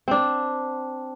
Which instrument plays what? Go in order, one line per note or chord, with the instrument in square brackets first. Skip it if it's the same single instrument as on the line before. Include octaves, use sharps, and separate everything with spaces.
[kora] C4 D4